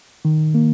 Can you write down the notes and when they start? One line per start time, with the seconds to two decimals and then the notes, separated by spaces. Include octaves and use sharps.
0.25 D#3
0.55 A#3